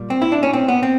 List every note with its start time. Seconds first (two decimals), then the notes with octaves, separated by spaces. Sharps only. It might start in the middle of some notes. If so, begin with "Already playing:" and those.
Already playing: A#2 G3
0.10 C4
0.22 E4
0.32 D4
0.43 C#4
0.53 C4
0.68 B3
0.83 C4